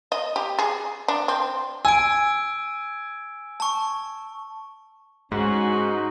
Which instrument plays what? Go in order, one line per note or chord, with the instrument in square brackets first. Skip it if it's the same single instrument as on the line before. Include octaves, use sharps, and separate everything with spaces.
[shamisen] D#5
G4
G#4
D4
C4
[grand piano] G#5 [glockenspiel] E6 D7
[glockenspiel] A5 C#6
[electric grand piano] G#2 [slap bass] G#3 [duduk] C#4 [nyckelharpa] F#4
[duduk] D#4